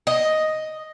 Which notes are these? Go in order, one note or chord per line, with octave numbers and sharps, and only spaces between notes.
D#5